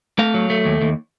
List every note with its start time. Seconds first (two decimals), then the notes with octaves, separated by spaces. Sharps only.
0.19 A3 F5
0.34 F#3
0.50 A3
0.65 D#2
0.81 D#2